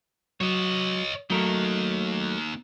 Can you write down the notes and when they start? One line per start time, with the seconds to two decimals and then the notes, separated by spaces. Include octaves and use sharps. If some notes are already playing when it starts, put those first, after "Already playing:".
0.41 F#3 C#5 D#5
1.30 F#3 A3 A#3 D#4 A#4